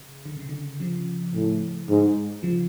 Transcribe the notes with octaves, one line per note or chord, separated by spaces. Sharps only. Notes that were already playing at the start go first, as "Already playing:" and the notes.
Already playing: C#3
D3
C#3
D3
C#3 F3
A2
G#2
C#3 F3